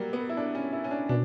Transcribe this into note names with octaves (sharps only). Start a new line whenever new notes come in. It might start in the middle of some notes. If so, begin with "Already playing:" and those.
Already playing: F#3 G3 A#3
B3
E4
D4
C#4
E4
C#4
D4
B2 D4